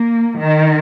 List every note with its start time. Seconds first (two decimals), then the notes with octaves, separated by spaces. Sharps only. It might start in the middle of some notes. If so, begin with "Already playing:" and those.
Already playing: A#3
0.38 D#3